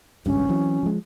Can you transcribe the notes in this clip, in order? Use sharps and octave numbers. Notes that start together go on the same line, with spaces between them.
G#1 C#2 G2 C#4
E3 F#3 C4
F3 G#3